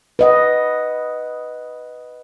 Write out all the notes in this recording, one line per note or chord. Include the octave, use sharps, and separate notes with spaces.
B4 D#5 F#5